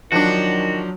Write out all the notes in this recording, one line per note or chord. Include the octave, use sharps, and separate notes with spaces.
D#3 F3 F#3 D4 F#4